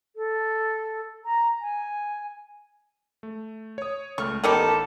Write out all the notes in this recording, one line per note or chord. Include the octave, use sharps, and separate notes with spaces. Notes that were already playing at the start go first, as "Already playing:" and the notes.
A4
A#5
G#5
A3
C#5 D#6
C#2 A3 C#6 F6
A1 D#3 B3 D#4 G4 A4 F#5